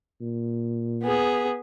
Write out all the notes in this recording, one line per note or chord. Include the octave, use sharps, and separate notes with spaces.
A#2
B3 G#4